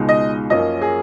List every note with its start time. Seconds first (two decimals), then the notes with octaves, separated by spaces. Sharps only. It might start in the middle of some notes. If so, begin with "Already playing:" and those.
Already playing: C#2 B2 G#3 D#4
0.09 D#5
0.50 F#2 F3 A#3 C#4 D#5
0.82 G#4